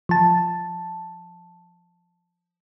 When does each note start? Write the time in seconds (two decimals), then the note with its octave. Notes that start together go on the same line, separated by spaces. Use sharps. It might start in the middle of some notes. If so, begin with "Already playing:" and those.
0.09 F3 A5